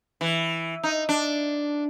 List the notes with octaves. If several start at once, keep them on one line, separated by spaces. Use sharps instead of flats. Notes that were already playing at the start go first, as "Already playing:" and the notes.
E3
D#4
D4